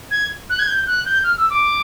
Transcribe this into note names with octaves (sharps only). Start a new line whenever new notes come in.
G#6
F#6
G#6
G6
F#6
G6
F6
E6
D6